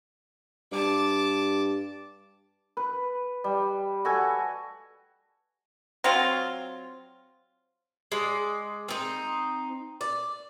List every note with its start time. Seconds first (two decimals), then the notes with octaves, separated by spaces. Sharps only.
0.72 G2 A5 D6
2.77 B4
3.44 G3
4.05 F#4 A4 G#5
6.04 F#3 C4 F4
8.12 G#3 D5
8.89 C4 D#4
10.01 D5